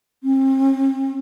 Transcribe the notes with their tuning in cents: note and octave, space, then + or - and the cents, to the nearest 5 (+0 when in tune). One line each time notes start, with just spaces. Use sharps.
C4 +40